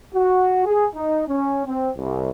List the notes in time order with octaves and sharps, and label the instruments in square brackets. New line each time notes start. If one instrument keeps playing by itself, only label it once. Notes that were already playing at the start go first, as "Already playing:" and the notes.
[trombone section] F#4
G#4
D#4
C#4
C4
C2